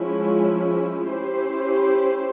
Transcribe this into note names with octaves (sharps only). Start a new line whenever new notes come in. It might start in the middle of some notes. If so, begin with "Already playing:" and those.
Already playing: F3 G#3 C#4 E4
C#4 E4 G4 C5